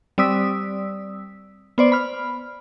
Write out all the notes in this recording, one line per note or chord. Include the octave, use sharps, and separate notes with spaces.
G3 C4 D5 D#6 E6 B6
B3 C5 D5
B5 F6